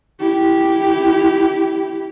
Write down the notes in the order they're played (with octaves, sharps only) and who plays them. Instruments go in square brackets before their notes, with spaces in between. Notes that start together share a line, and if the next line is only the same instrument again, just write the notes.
[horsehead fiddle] E4 G4